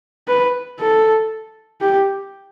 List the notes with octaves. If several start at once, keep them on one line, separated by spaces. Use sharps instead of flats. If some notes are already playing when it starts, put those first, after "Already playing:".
B4
A4
G4